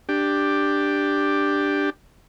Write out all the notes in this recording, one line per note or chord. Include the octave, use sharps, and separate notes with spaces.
D4 G4